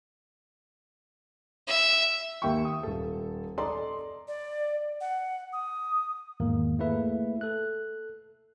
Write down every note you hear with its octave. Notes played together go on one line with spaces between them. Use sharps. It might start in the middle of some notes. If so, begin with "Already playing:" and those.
E5
D#2 A#3 E5 G5 C#6
D#6
D#1 A4
A4 D5 D#5 A#5 C6
D5
F#5
D#6
E2 G#2 D#3 A#3 A#4
A3 A#3 E4 G#4 B4 E5
A4 F#6